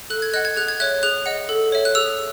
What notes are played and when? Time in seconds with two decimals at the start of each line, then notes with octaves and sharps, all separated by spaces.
0.10 A4 F#6
0.22 G#6
0.34 D#5 F#5 F#6
0.45 G#6
0.57 G#4 F#6
0.68 G#6
0.80 C#5 E5 F#6
1.03 G#4 F#6
1.26 D#5 F#5
1.49 A4
1.72 C#5 E5
1.85 F#6
1.95 G#4 E6